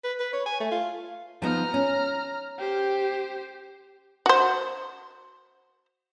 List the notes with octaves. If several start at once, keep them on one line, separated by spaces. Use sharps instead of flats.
B4
B4
C#5
G#5
A3
F4
F3 B3 D#4 A#5 F6
C#4
G4 C5
F#4 C5